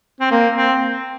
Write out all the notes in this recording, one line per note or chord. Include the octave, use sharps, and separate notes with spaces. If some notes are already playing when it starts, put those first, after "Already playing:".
C4
A#3
C4